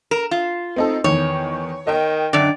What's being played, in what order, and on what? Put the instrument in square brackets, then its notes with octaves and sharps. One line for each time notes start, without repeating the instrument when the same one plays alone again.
[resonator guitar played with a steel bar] A#4 [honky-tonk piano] E7
[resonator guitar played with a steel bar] F4
[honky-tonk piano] C4 D#4 A4
[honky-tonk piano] E2 D#3 [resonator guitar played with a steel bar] C#5
[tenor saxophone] D#3 [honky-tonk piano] D#5 G5
[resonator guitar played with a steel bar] F#2 D3 [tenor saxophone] D5